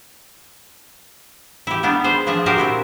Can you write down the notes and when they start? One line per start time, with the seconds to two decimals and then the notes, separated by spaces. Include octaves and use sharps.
1.67 E4 G4
1.83 G3 B3 D4 D#4
2.04 G#4 B4 C5
2.27 F3 D4 G#4 D#5 E5
2.46 F#4 G4 A#4 C5
2.58 A#2 C4 E4